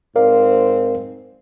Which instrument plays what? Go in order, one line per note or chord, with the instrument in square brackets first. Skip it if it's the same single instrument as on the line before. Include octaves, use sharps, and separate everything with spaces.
[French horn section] G#2 C4 C5 [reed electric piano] A#4 D5 F5